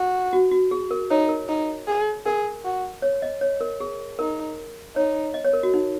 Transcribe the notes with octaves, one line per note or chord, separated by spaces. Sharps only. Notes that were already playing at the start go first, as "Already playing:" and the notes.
Already playing: F#4
F#4
F#4
G#4
A#4
D#4 C#5
A#4
D#4
G#4
G#4 A#4
F#4
C#5
D#5
C#5
A#4
G#4
D#4 A#4
D#4 C#5
D#5
C#5
A#4
F#4
D#4